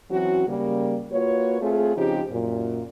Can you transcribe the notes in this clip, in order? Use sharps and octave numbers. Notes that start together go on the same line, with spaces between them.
E3 F#3 C4 C#4 F#4
C#3 G3 A#3
A#3 F4 F#4 B4 C#5
A3 C4 F4 G#4
C#3 F3 C4 D#4 G4
F#2 A#2